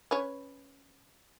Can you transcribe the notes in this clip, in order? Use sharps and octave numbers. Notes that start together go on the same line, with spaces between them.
C#4 B4 C#5